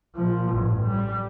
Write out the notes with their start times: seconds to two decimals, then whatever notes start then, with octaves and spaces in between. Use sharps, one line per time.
0.15 A#2 F3
0.50 A1 G2
0.81 G3